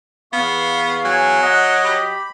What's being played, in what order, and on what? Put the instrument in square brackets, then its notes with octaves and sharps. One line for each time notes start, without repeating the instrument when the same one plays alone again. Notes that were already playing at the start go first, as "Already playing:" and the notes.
[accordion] E2 F5 [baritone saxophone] B3 [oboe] C#6
[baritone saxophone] F#3 [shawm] G#5
[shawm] D#5 [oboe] F#5
[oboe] G4 [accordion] B5